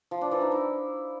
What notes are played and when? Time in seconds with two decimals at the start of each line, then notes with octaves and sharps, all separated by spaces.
0.11 F3
0.21 D4
0.31 E3
0.42 D#4
0.52 E4